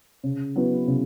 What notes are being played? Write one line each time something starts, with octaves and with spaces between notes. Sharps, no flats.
C#3
F#3 B3 E4 B4
C#3